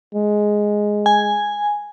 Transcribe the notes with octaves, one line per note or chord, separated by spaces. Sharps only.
G#3
G#5